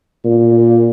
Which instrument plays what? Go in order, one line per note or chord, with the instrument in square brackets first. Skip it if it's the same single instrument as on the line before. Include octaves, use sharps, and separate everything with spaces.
[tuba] A#2